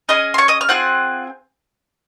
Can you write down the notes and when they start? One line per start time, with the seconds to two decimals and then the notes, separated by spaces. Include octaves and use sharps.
0.09 C#4 G#4 D#5 D#6
0.34 C6
0.38 C#5 C#6
0.48 D#5 D#6
0.61 F6
0.69 C4 F4 G#4 F#5 F#6